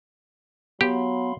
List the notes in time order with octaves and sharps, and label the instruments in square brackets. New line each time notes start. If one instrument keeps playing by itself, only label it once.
[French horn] F#3 [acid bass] B3 [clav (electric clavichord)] G4 [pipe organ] F5 B5 C6